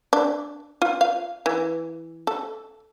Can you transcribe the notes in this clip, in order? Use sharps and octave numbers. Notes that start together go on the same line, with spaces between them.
D4
F4
F5
E3
A4